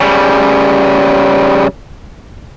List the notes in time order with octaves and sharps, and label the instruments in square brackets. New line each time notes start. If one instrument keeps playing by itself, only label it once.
[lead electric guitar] C#3 G3